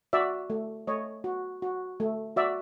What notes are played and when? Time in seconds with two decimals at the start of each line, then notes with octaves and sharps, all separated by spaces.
0.13 F#4 D5 E5
0.50 A3
0.87 A3 C#5 D#5
1.24 F#4
1.62 F#4
2.00 A3
2.36 F#4 D5 E5